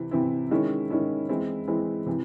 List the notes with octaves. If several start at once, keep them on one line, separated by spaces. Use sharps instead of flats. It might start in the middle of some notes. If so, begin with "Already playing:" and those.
Already playing: C3 E3 C4 E4
C3 E3 C4 E4
D#3 G#3 C#4 E4
D#3 G#3 C#4 E4
E3 G#3 C4 E4
E3 G#3 C4 E4
C3 E3